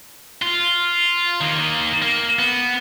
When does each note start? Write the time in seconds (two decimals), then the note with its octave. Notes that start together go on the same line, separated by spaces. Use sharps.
0.42 F4
1.41 D#3 A#3
2.02 A#3
2.39 B3